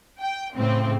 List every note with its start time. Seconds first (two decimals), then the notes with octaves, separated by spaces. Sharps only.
0.20 G5
0.56 A2 C#3 C4